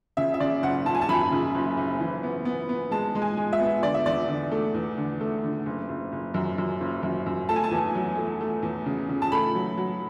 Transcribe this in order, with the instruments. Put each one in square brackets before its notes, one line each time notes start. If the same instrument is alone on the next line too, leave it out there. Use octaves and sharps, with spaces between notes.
[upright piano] C#3 E5
E5
C#3 D5
F#1 F#5
F#1 A5
G#5
A5
F#2 B5
C#3
F#1
F#1
E3
B3
B3
B3
G#3 A5
G#3
G#5
G#3
E5
B3
D3 D5
E5
E2 D5
D3
A3
E2
D3
A3
D3
F#1
F#1
F#1
F#2
F#2
F#1
F#2
F#2
A3 A5
G#5
A5
E2
F#3
A3
A3
E2
C#3
C#3
A5
A3 B5
F#3
F#3